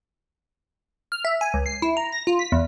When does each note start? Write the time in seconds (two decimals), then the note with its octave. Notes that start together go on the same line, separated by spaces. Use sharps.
1.12 F6
1.25 E5
1.41 G#5
1.54 C#2
1.66 C7
1.82 E4
1.97 A#5
2.12 A#6
2.27 F4
2.39 B6
2.52 E2